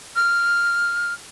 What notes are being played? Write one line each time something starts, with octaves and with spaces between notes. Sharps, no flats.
F6